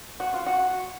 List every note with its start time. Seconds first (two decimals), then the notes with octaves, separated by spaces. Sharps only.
0.20 F#4
0.34 F4
0.46 F#4